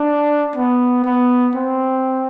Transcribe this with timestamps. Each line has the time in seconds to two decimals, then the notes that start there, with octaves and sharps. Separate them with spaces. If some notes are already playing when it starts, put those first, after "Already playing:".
Already playing: D4
0.56 B3
1.05 B3
1.55 C4